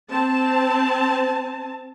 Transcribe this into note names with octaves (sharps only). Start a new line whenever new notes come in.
C4 A5